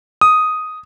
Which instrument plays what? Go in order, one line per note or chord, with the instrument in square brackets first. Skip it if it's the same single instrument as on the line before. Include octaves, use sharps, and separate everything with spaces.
[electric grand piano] D#6